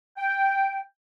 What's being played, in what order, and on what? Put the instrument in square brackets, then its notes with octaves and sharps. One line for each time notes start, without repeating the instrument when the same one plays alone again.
[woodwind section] G5